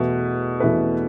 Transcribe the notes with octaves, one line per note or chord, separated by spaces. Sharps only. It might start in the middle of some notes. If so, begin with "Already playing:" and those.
Already playing: E2 B2 A3 E4 B4
E2 B2 A3 E4 B4